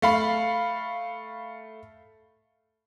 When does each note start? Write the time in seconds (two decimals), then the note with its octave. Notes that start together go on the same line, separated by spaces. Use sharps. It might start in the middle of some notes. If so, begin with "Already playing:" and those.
0.02 A3 F5 B5